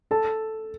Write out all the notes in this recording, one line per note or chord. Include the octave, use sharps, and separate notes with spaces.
A4 A5